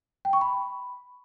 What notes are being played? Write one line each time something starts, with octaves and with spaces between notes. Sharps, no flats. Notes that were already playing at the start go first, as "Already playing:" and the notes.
G5
C#6
B5